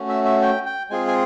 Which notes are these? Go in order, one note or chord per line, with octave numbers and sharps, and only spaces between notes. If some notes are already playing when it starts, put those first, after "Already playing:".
Already playing: A3 C#4 F#4
E5
E5
G5
G5
G#3 C4 F4 G#4 G#5
G#5